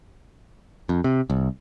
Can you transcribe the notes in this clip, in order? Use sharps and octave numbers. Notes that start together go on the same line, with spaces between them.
F2
C3
C2